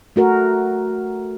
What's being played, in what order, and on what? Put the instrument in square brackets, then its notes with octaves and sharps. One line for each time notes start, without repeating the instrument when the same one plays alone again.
[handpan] A3 F#4 A#4